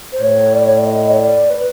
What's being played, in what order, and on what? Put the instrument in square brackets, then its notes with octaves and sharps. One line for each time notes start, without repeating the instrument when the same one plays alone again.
[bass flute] C5
[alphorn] A2 [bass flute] C#5
[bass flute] D5
C#5
D5
D#5
C#5
D5
B4